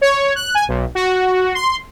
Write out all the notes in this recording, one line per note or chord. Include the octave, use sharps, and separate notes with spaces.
C#5
F#6
G#5
B1
F#4
C6